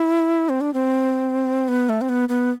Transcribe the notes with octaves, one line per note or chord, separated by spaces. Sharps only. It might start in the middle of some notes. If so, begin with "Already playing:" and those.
Already playing: E4
C4
D4
C4
B3
A3
C4
B3
B3